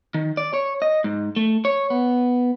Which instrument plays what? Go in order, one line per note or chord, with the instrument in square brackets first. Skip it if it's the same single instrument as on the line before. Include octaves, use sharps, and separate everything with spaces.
[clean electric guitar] D#3
D5
C#5
D#5
G#2
A3
C#5
B3